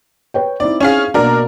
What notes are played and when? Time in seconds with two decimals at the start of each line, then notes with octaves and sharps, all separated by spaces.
0.34 B4 C#5 G5
0.60 C4 D#4 E4 D5
0.81 C#4 G#4 F5
1.14 B2 A#3 D4 F#4 A#4